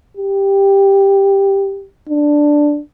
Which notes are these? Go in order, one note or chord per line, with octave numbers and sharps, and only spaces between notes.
G4
D4